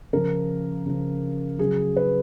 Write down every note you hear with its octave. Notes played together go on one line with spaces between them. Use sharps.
C#3 F3 A#4
C#3 F3
C#3 F#3 G#4
B4